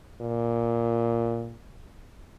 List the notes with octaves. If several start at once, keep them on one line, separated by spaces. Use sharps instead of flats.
A#2